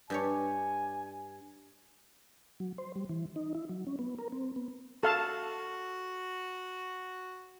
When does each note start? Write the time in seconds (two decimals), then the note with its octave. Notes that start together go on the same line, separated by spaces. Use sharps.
0.10 G2 G4 C#5 G#5
2.60 F#3
2.78 C5
2.96 G3
3.09 E3
3.36 D#4
3.55 E4
3.69 F#3
3.87 C#4
3.99 B3
4.18 A#4
4.32 C4
4.56 B3
5.03 F#4 A4 F5 A5